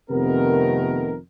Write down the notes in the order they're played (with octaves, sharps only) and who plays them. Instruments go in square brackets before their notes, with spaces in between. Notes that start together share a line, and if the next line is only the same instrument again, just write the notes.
[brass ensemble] F2 C3 D#3 A3 B3 A#4